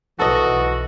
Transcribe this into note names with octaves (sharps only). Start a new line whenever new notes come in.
B1 E3 F#4 A4 D#5